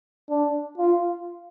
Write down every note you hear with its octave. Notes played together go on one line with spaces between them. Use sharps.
D4
F4